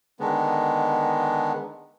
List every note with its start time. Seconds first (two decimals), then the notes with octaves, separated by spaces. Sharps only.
0.20 D3 D#3 G#3 B3